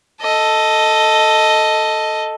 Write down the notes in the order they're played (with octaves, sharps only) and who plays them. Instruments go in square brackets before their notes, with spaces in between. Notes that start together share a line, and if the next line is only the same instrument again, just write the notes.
[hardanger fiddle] A4 D#5